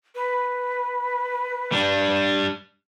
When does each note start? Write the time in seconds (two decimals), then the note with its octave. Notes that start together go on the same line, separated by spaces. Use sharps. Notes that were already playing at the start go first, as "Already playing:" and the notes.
0.15 B4
1.72 G3 D4